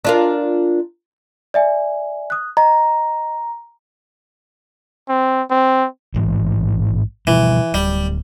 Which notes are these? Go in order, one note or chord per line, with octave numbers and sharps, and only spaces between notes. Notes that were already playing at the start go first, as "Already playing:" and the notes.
D4 F4 A#4
D5 E5 G#5
D#6 F#6
D#5 A#5
C4
C4
A1 G#2 E3
B2 E3 F3 G3
D1 G3